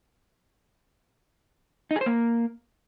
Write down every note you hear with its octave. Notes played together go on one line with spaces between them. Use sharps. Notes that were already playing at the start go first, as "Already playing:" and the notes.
D#4
G#4
C5
A#3